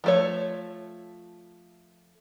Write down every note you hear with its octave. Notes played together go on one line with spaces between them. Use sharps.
F3 A3 C#5